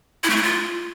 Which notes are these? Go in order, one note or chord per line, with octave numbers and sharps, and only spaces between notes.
E4
A3
E4
F4